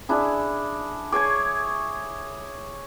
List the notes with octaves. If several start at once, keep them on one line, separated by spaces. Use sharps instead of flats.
D4 E4 G#4
G#4 C#5 C#6 D6 G#6